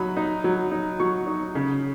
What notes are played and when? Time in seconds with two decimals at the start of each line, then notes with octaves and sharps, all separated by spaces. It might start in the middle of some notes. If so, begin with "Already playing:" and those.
Already playing: F#3 D#4 B5
0.17 D#4
0.44 F#3
0.71 D#4
1.00 F#3 C#6
1.27 D#4
1.55 C#3